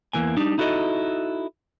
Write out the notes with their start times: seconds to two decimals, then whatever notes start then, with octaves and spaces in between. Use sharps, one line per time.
0.13 E2 E3 A#3 G#5
0.37 G3 D4 D#4
0.58 D#4 E4 F#4 A4 D5 D#5